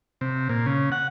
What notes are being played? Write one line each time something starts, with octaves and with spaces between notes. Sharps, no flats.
C3
A#2
C#3
F#5